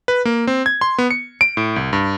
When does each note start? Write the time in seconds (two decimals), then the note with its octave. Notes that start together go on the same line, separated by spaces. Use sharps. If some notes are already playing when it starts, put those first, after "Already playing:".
0.08 B4
0.25 A#3
0.47 C4
0.66 G#6
0.81 C6
0.98 B3
1.11 C#7
1.41 D7
1.57 A2
1.76 C2
1.93 G2